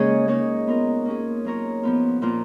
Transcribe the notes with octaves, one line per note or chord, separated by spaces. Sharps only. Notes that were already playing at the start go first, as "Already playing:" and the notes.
Already playing: C#3 G#3 A#3 C#4 G#4 C#5
A#3 D#4 G#4 C#5
B3 F4 A#4
A#3 C#4 G#4
F#3 A#3 F4 A#4 C#5
F3 B3 F4
A#2 F3 A#3 F4